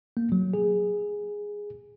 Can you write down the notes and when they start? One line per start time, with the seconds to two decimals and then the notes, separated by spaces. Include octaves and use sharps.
0.17 A#3
0.32 F#3
0.54 G#4